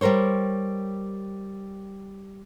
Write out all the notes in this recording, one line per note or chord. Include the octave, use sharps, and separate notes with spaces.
G3 G4 A#4 C5 C#5